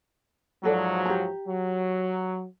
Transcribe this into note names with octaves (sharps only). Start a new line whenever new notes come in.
G#2 F3 F#3 F#4 A4 D5
G4 A#5
F#3